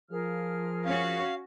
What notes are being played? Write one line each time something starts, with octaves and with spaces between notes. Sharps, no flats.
F3 G#4 A#4 F6
C#4 F#4 F5